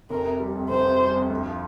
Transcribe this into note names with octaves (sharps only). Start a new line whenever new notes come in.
F1 A#4
C3
G3
F2
F1 C5
C3
G3
F2
D2
F3